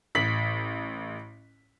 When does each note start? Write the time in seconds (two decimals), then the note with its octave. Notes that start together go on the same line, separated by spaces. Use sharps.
0.15 A1 B6 F#7